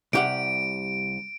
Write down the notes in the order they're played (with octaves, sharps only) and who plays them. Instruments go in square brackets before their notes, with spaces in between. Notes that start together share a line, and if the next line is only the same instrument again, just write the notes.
[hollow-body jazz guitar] C2 G4 F#5 [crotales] D7